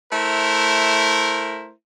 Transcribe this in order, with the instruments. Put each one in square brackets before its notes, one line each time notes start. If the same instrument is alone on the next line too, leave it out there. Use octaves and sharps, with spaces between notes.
[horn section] A3 E4 A#4 C5